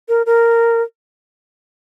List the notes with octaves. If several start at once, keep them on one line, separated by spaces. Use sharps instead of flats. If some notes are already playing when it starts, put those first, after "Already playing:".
A#4
A#4